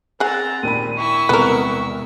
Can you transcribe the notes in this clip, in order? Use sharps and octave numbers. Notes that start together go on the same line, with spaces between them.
C4 G#4 F#5 A#5 A6
D#2 A#2 D4 B5 D#7
E4 C#6 E6
E1 C2 B3 A#4